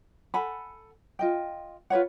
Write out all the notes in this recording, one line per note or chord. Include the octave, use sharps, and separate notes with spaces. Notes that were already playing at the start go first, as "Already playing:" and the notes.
A4 F#5 G#5 B5
F4 D#5 G5
F4 B4 C#5 F#5